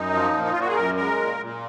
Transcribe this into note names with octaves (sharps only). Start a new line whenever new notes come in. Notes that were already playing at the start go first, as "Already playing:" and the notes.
Already playing: F#2 D#4
F3
A#2
D#4
F4
A#2
F#4
G#4
F#2 A#4
G#3 A#4
A#2
A#2